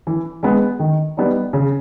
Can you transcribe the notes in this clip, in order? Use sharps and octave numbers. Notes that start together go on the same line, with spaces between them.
E3
G#3 B3
D#3
G3 B3 D#4
C#3